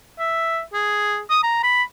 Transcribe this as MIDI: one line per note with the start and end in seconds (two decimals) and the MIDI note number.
0.19 0.61 76
0.73 1.21 68
1.30 1.39 87
1.43 1.60 82
1.63 1.83 83